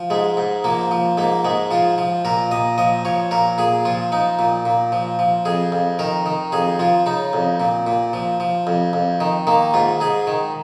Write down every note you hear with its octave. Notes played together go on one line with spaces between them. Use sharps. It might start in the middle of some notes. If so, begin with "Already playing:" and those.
Already playing: F3
G#2 G#3
G#2
F3 A#3
F3
G#2 A#3
G#2 G#3
F3 F4
F3
A#2 A#4
A#2 D#5
F3 D#5
F3 C#5
A#2 A#4
A#2 G#4
F3 F4
F3 D#4
A#2
A#2
F3
F3
F2 G#4
F2
D#3 A#4
D#3
F2 G#4
F3 F4
C#3 D#4
F2
A#2
A#2
F3
F3
F2
F2
D#3
D#3 A#3
G#2 F4
G#2 G#4
D#3